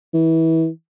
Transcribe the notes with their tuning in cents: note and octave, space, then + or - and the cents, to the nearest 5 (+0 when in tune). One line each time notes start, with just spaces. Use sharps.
E3 -25